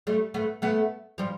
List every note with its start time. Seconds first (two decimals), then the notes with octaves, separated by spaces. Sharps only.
0.07 G3 A3
0.34 A3 B3
0.62 A3 B3
1.18 F3 G3